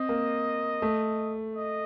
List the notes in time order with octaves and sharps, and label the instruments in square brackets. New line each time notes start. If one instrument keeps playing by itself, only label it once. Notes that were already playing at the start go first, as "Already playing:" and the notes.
Already playing: [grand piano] C4 [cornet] D#5
[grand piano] A#3
A3
[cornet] D#5